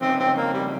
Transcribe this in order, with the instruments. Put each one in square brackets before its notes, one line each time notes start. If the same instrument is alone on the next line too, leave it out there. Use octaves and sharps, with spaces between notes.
[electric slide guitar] F2 C#3 D#4 [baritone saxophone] C4
[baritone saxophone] C4
A#3
G3